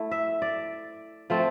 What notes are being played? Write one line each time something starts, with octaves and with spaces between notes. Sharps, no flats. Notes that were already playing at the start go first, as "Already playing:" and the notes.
Already playing: A3 E4
E5
D5
F3 A3 C4